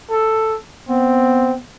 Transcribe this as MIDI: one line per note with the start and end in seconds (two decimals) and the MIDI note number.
0.11 0.58 69
0.89 1.61 59
0.89 1.54 60